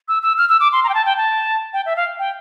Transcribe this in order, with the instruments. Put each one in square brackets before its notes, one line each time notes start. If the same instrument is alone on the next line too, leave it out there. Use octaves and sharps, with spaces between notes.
[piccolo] E6
E6
F6
E6
D6
C6
A#5
G5
A5
G5
A5
G5
E5
F5
G5